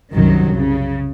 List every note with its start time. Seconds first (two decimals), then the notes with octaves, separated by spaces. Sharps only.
0.12 C2 F#2 D#3 F#3
0.56 C#3